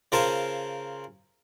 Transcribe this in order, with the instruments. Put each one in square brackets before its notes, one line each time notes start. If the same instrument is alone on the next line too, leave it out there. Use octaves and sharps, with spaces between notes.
[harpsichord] C#3 F4 A#4 C5 G#5 A5